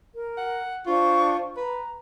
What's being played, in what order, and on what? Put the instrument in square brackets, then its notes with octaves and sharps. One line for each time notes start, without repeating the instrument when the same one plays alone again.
[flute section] A#4
[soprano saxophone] F#5
[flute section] D4 C5 C#6 [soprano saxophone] F4
[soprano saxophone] B4 [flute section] A#5